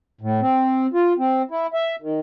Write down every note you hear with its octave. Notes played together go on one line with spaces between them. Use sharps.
A2
C4
F4
C4
E4
E5
D#3